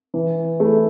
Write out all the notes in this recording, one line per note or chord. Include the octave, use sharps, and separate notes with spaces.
E3
A3 E4